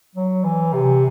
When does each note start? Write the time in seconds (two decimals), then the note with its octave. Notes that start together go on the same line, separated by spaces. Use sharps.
0.15 F#3
0.44 E3
0.73 C3